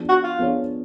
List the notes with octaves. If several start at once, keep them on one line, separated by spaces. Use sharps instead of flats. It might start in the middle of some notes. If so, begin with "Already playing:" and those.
Already playing: F3 B3 D4 G#4
F#4
F4
F3 B3 D4 G#4 C#5